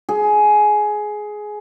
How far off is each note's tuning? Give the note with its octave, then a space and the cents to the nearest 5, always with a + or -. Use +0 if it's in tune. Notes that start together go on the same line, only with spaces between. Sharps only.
G#4 +15